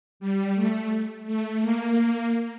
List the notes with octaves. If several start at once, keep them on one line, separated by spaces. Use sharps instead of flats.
G3
A3
A3
A#3